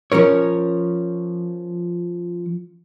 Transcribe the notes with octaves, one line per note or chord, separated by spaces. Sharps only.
F3 C#4 A#4 C#5